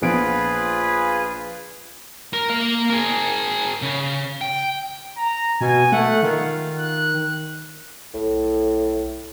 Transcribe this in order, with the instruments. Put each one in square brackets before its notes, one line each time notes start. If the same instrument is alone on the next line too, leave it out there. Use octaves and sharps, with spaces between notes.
[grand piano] A#1 B3 D7 [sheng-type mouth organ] F4 G#4 B4
[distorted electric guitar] A#4
A#3 F5
G#4 A#4
C#3
G5
[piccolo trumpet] A#5
[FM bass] B2 [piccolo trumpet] G#5
[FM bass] A3 [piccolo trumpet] F#5
[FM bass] D#3 [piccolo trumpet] F4
[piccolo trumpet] F#6
[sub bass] B1 [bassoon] A2